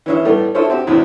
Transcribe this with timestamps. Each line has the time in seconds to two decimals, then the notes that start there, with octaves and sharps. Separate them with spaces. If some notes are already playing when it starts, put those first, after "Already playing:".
0.06 E3 C#4 E5
0.25 A2 G3 A3 B3
0.55 E4 F4 A4 C5 C#5
0.70 C4 F#4 G4
0.87 E2 A2 C3 C4